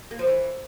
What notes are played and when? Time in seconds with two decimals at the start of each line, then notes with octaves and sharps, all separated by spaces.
0.11 A#3
0.19 F3
0.27 E3